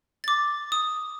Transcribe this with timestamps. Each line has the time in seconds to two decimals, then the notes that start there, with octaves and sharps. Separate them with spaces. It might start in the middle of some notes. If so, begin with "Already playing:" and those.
0.24 D6 A6
0.72 D#6